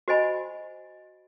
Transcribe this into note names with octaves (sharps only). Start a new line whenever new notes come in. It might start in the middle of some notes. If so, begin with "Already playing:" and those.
F#4 C5 D#5 G#5 B5